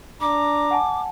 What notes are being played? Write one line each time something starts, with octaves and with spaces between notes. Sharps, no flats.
D4 A#5 D6
F#5 G#5 A5